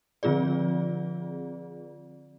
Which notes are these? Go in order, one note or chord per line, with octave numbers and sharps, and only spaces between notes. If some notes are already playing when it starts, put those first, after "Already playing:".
D3 F3 C4 F4 G#4 D5